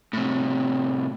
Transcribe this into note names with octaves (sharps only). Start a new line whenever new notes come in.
A2 C3